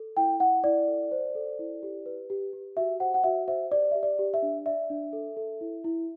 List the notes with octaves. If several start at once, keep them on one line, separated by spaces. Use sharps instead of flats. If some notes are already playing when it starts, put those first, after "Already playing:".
Already playing: A4
E4 G5
E4 F#5
E4 D5
A4
C5
A4
E4
G4
B4
G4
G4
F#4 E5
C5 F#5
F#5
F#4 E5
C5 E5
G4 D5
G4 E5
D5
G4
E5
D4
D5 E5
D4
A4
A4
E4
E4